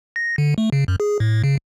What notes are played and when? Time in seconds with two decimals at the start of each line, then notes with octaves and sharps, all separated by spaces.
0.16 A#6
0.38 D3
0.58 A3
0.72 C#3
0.88 F#2
1.00 G#4
1.20 A2
1.44 C#3